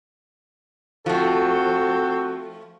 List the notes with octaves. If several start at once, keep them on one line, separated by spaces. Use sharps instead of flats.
F3 A3 C4 F#4 A4